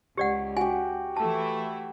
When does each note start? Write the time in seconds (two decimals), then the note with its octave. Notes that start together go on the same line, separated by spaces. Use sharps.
0.17 C#2 G4 D5 F#5
0.57 F#4 G4 G#5
1.17 E3 A3 E4 A5